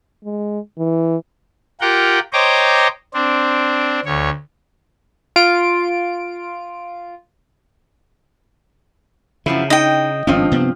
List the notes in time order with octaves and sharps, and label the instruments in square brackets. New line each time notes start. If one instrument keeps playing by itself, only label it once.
[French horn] G#3
E3
[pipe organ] F4 G4 A#4 F#5 G5
C5 C#5 D#5 G5 A#5 D6
C4 D4
D2 C#5
[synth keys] F4 D7
[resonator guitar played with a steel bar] F#2 F3 E4 [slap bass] C#3
[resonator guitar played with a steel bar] D#4 [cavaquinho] D#5 G5
[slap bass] G#1 C4 C#4 [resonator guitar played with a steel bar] G2 F3
[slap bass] C3 B3 C4